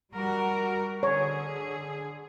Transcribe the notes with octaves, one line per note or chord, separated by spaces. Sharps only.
G3 F#4 A#4
D3 G#4 C#5